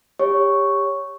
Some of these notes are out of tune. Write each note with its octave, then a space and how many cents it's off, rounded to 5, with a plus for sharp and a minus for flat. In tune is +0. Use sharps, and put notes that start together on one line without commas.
G4 +25 C#5 +0 C#6 +0